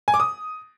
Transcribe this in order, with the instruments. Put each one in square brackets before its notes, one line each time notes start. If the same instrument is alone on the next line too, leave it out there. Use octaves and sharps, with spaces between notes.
[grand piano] G#5
D6
D#6